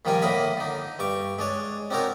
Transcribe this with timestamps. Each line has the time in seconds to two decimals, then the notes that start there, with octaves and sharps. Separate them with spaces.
0.05 A#2 D#3 F3 G3 A#4 G#5
0.22 A2 D3 A#3 D#5 F#5 B5
0.57 D3 D#4
0.99 G2 C#6 D6
1.39 G#3 D4 C#5
1.90 C4 D4 D#4 F#4 A#4 C#5